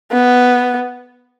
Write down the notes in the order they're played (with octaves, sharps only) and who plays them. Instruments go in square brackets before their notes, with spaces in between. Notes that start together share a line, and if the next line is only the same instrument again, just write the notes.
[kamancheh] B3